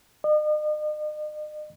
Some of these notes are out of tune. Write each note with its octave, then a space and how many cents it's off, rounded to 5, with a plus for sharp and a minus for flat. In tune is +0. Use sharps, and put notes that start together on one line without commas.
D#5 -40